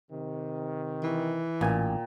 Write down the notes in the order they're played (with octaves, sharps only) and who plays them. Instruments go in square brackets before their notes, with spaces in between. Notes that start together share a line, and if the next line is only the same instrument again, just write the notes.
[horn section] C3 D#3
[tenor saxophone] E3
[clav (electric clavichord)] A1 G#5 [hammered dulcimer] A#2 G5